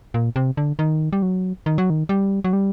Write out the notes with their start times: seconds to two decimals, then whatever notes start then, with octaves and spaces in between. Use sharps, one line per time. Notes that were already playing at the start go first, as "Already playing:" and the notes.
0.14 A#2
0.36 C3
0.57 D3
0.79 D#3
1.13 G3
1.22 F#3
1.66 D#3
1.78 F#3
1.90 D#3
2.09 G3
2.44 F#3
2.53 G3